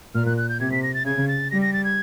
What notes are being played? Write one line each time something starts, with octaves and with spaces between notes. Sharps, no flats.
A#2 F6
F#6
F#6
G6
C3 G#6
B6
A#6
A6
C#3 G#6
A6
G3 A#6
A#6
A6
G#6